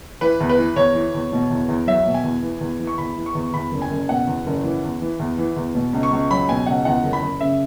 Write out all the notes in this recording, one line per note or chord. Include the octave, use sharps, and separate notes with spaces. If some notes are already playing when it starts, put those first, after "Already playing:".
E3 B4
E2
B4
E3
E2 C#5
E3
E2
B2
E2
E2
F#3 E5
B2
G#5
E2
E3
E2
E3
C#6
E2 B5
E3
C#6
E2
E2 B5
F#1
G#5
F#1
B2 F#5
E2
F#1
E3
E2
E3
E2
E3
E2
B2
C#2
C#6
C#2
F#3 B5
B2 G#5
C#2 F#5
E2 F#5
F#1
B5
F#1
C#3 E5